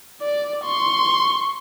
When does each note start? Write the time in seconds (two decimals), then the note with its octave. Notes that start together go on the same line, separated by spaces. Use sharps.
0.21 D5
0.65 C6 C#6